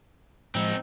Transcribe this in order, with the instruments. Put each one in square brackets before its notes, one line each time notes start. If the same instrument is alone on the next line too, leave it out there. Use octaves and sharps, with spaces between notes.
[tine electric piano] A2 F3 G#3 [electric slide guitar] C4 D#4